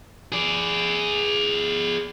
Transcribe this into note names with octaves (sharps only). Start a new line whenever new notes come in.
G#4 D5